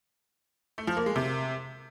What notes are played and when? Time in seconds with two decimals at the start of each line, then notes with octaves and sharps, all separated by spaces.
0.78 A3
0.87 F3
0.97 A#3
1.06 G#3
1.16 C3